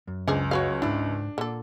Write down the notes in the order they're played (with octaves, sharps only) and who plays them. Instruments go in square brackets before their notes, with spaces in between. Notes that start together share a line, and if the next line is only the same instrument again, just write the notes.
[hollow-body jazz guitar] F#2
[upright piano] C#2 [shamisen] D4 G#4 C5
[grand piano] F#3 C#5 [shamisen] F#4 B4 F5
[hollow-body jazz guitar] D2 G#2 [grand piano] D4 [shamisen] E4
[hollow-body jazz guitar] A#2 [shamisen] D3 A4